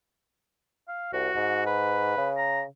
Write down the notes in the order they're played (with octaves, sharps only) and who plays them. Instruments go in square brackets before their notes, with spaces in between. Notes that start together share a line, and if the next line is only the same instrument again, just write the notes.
[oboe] F5
[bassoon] C2 [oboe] F#4
[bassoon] G#2
[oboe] B4
[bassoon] C#3
[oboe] A#5